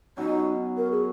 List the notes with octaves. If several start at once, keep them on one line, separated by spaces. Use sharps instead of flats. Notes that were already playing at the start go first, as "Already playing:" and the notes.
B2 F#3 C#4 D#4
A#4
G#4